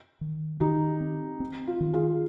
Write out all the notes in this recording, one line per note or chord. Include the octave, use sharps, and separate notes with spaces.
D#3
D#3 D#4 G4
C4
C4
F4
D#3
F4 G#4